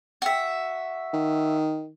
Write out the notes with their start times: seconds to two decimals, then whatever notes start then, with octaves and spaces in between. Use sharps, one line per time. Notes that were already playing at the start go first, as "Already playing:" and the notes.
0.22 F#4 E5
1.14 D#3